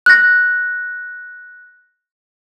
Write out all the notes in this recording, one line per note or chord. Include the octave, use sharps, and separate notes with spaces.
F#6 A#6